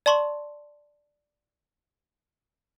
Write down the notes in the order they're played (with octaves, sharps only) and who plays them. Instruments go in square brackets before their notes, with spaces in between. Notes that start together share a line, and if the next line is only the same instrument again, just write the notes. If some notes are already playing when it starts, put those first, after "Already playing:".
[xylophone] D5 A5 C6 C#6 F#7